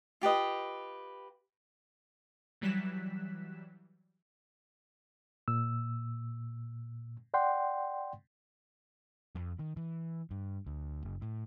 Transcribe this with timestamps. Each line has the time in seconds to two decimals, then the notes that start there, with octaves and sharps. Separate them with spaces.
0.21 F4 G4 B4 D#5
2.61 E3 F#3 G3 F#6 B6 E7
5.48 A#2 E6
7.34 D5 F#5 G5 C6
9.35 F2
9.59 D#3
9.77 E3
10.31 G2
10.66 D2
11.03 F#1
11.22 A2